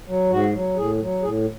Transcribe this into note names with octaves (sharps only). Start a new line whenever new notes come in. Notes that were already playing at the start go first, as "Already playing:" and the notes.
F#3
G#2 F#4
F#3
A2 G#4
F#3
A2 G#4